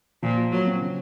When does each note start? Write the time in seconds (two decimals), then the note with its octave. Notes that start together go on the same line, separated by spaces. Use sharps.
0.22 A#2 F3
0.37 F4
0.52 A#2 F#3
0.66 C4
0.81 C#3